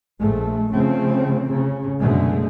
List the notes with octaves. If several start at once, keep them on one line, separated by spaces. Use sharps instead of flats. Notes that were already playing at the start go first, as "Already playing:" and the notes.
A#1 G#3 A3
C#3 F3 A3 C4
C#3
C2 F#2 B2 D3 G#3 A3